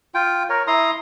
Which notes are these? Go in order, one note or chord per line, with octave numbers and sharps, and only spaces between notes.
F4 G5
A#4 C#5
E4 A#5 C6 D#6